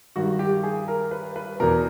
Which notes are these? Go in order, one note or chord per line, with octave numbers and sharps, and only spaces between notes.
G2 D#3 F#4
G4
G#4
A#4
B4
B4
E2 B2 A#4